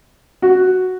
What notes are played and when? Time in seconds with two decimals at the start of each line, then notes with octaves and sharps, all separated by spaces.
0.42 F#4